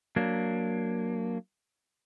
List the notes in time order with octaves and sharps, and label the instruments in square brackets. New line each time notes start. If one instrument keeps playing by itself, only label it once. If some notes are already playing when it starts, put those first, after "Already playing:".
[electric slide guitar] F#3 A#3 D4